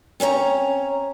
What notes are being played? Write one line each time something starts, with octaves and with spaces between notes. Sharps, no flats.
C4 C#4 C#5 A#5